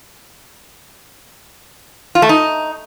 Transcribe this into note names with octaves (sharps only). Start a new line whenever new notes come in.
F4
A3
D#4